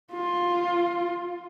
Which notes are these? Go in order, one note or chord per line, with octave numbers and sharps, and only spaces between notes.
F4